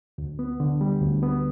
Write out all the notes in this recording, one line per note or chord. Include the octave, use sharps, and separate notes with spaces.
D2
B3
D3
G3
D2
B3